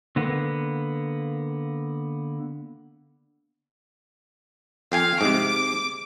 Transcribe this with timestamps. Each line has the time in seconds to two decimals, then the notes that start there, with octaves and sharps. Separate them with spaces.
0.16 D3 A#3 B3
4.92 F2 F5 G5 G#5
5.21 G#2 C3 D6